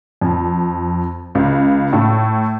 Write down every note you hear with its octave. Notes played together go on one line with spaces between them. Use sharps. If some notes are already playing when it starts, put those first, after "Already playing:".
F2
C#2
A2